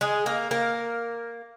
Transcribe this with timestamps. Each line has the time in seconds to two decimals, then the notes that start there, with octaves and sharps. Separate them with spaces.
0.01 G#3 G#4
0.26 A#3 A#4
0.51 A#3 A#4